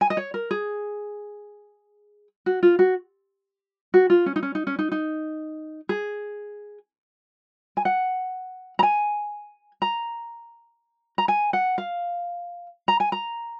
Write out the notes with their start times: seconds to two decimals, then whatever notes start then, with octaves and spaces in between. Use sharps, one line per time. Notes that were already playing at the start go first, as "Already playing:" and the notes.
0.01 G#5
0.10 D#5
0.17 C#5
0.34 A#4
0.51 G#4
2.46 F#4
2.63 F4
2.79 F#4
3.94 F#4
4.10 F4
4.26 C#4
4.36 D#4
4.43 C#4
4.55 D#4
4.67 C#4
4.79 D#4
4.92 D#4
5.89 G#4
7.77 G#5
7.85 F#5
8.79 A#5
8.83 G#5
9.82 A#5
11.18 A#5
11.28 G#5
11.53 F#5
11.78 F5
12.88 A#5
13.00 G#5
13.12 A#5